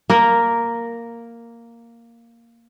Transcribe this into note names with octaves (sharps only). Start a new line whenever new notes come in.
A#3 A#4